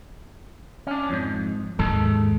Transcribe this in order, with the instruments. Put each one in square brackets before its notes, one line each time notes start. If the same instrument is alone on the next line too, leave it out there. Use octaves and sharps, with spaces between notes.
[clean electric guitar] C#4 D4
F2 G#2
[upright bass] D#2 G#2 [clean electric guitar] G#3 A4 A5